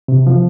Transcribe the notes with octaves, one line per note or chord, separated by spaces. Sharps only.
C3
F3